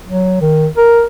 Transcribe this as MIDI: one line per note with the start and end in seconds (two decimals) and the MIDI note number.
0.08 0.36 54
0.41 0.67 51
0.77 1.05 70